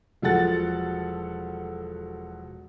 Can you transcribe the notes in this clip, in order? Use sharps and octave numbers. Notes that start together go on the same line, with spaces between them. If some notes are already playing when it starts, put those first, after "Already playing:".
E1 F3 F#3 A4 F#5 A6